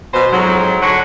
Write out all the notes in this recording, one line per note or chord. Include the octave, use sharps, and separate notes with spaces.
B2 C5
F2 G#2 F#3
D3 F#3 F#4 C#5